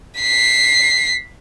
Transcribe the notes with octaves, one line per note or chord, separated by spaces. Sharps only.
B6 C7